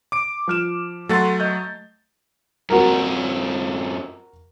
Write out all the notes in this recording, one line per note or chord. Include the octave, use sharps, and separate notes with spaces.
D6 D7
F3 F6 E7
F#3 A3 A4 F#5 C6 A6
D#5 G6
F#2 C4 F#4 A#4